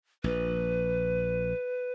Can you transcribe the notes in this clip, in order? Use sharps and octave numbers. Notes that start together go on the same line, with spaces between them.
A#1 B4